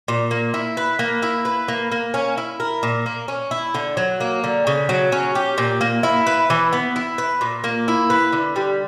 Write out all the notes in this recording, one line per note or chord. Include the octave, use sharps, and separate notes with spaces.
A#2
A#3
E4
B4
A#3
E4
B4
A#3
A#3
C#4
E4
A#4
A#2
A#3
C#4
E4
D3
F#3
A#3
D3
C#3
F#3
C#4
G4
A#2
A#3
E4
B4
E3
B3
E4
B4
A#2
A#3
E4
B4
D3
G3